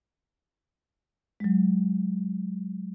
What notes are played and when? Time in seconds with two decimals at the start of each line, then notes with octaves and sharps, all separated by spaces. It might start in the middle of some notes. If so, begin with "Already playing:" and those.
1.40 F#3 G#3